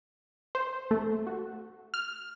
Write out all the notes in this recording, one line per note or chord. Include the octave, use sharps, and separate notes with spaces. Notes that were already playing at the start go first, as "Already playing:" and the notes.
C5
A3
F#4
F6